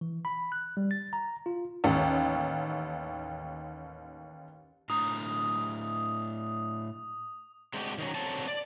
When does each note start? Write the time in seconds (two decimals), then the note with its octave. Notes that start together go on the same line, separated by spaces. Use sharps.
0.01 E3
0.25 B5
0.52 F#6
0.77 G3
0.91 A6
1.13 A#5
1.46 F4
1.84 A1 D#2
4.90 A2 D4 A#5 D#6
7.73 F#3 G#3 C4 D4 F#4 G4
7.98 D#3 F#3 C#4
8.15 D3 F#3 C4 C#5 A5
8.48 D5